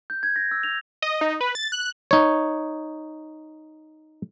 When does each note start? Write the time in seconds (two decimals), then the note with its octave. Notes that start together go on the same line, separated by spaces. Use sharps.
0.10 G6
0.23 G#6
0.36 A#6
0.51 E6
0.63 F7
1.02 D#5
1.21 D#4
1.41 B4
1.55 A6
1.72 F#6
2.11 D#4 C#5